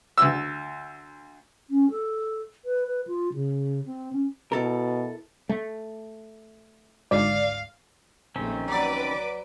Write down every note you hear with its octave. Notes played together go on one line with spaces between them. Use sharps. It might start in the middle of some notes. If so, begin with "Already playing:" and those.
D2 E6
C#4
A4
B4
B4
F4
C#3
C4
C#4
B2 E4 A4 A#4
A3
G#1 D2 G#2 D5 F5
A#1 D#2 D#3 A3 C4 C#4
F#3 B4 D5 D6